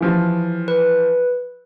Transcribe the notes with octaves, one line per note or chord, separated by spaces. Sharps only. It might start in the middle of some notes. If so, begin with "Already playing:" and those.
E3 F3 G4
B4